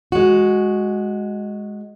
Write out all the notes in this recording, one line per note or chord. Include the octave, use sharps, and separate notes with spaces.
G#3 F#4